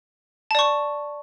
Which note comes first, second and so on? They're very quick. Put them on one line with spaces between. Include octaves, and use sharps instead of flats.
A5 D5 C#6